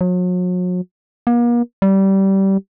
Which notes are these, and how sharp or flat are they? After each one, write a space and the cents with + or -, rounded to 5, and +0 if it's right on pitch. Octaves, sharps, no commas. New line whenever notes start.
F#3 -40
A#3 +40
G3 -20